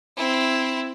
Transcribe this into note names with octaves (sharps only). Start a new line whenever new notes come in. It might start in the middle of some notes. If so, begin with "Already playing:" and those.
C4 E4